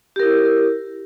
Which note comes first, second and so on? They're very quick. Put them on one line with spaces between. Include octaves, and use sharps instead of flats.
G4 A#4 E4